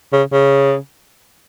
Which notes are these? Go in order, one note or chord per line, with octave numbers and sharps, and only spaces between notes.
C#3
C#3